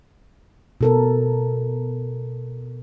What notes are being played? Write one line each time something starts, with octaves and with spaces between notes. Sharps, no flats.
B2 A4 A#4